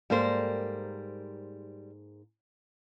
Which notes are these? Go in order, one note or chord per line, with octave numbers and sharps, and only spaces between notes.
G#2 G3 A#3 A4 A#4 C5